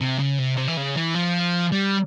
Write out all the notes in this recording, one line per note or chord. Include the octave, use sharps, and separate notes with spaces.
C3
C#3
C3
C3
E3
C#3
E3
F3
G3